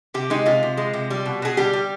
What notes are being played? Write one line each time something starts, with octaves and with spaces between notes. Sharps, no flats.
C3 G4
G#3 D#4
C3 F4
C3
G#3
C3
G3
B2
B2 G#4
G3 G4
G3